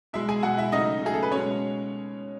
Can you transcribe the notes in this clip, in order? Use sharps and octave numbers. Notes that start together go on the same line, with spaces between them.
B2 G#3 E4 E5
G#4 G#5
B2 G#3 F#4 F#5
E4 E5
C#3 F#3 A3 D#4 D#5
C#3 F#3 A3 G#4
A4
B4
B2 G#3 C#4 C#5